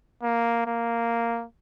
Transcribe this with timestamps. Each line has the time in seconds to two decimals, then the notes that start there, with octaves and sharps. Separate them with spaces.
0.23 A#3
0.66 A#3